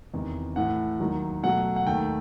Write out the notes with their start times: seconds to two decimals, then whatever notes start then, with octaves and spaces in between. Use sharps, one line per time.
0.14 E2 C3 D#3
0.56 A2 E3 A3 F#5
1.00 D#2 D#3 F#3
1.43 B2 F#3 A3 F#5
1.76 F#5
1.87 D#2 D#3 A3 G5